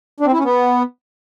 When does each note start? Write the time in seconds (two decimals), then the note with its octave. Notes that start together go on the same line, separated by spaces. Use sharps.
0.20 D4
0.26 C4
0.32 E4
0.38 C#4
0.44 B3